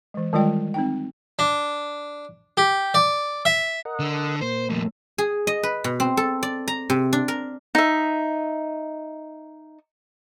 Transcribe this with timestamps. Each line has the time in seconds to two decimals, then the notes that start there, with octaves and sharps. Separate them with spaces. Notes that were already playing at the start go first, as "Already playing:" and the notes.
0.14 E3 G#3
0.33 D#3 G3 G#3 F4 D5 G5
0.74 C4 D#4 G5
1.39 D4
2.57 G4
2.94 D5
3.45 E5
3.85 A#4 D#5 F#5
4.00 D3
4.42 A#2 A#3 C5
4.70 F2 A2
5.18 G#4
5.47 D#5
5.63 B4
5.84 B2
6.00 C4
6.17 A4
6.43 D5
6.68 A#5
6.90 C3
7.13 D4
7.28 A#4
7.75 D#4 E5